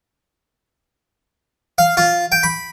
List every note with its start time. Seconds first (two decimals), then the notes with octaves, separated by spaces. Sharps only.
1.78 F5
1.97 F4
2.32 G5
2.43 B5